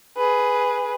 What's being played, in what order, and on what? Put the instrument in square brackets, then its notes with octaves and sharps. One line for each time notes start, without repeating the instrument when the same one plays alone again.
[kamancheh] G#4 B4